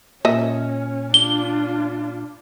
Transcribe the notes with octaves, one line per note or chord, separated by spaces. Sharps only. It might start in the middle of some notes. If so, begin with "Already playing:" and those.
A#2 C#4 D#5 E5
D4 F4 G7